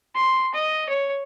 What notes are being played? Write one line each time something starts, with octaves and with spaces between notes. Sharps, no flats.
C6
D#5
C#5